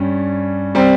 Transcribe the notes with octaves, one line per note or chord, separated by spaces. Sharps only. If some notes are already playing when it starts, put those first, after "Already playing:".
Already playing: G2 G3 C#4
G3 C4